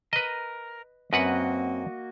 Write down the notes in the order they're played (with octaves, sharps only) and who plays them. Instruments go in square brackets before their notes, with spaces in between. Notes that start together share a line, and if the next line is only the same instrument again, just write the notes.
[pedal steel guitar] A#4 [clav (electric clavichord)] B4 D#5
[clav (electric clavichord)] F#2 B4 F#5 [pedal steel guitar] A#3 F#4 D#5 [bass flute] C4